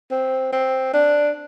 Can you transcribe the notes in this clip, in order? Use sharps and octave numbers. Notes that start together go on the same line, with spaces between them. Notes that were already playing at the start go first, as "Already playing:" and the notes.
C4
C4
D4